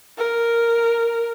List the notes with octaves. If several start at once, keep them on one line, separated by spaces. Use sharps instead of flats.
A#4